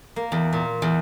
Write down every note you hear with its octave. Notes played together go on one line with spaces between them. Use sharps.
A#3
E2
A#2
E2